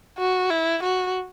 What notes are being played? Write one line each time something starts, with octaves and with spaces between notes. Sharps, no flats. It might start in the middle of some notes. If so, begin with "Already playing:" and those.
F#4
E4
F#4